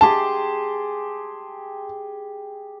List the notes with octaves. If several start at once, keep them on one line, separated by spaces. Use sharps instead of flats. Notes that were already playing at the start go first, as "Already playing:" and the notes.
G4 G#4 A5 C6